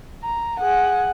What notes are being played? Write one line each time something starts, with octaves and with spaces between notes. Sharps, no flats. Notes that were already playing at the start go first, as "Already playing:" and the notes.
A#5
G#4 F#5